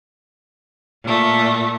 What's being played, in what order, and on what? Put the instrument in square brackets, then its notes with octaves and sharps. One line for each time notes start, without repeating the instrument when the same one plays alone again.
[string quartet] A#2 A3